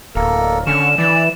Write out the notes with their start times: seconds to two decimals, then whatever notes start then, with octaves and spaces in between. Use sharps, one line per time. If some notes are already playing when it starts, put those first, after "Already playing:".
0.15 D1 A#3 A4 A#4
0.67 D3 C#4 C#6 F6 E7
0.98 E3 D5